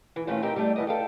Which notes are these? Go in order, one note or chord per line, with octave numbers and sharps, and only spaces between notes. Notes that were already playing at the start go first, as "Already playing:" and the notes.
E3
A#2 E3 A3 C4 C#4 F4
C4 D#4 G4 A#4 G5
G3 A3 D5
E3 B3 D#5
A4 F5 G5